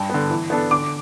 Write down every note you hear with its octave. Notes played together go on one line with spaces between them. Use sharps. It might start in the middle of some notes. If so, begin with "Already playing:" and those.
Already playing: G2 G5 A5
D3 B3
E3
B3 D4 A4
D3 D6